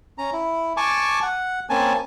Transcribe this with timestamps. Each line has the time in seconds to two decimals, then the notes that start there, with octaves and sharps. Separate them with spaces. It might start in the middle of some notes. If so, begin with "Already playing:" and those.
0.18 C#4 A#5
0.33 E4
0.77 G#5 A5 C#6 D6
1.23 F#5
1.70 A#3 C4 C#4 G#5 A5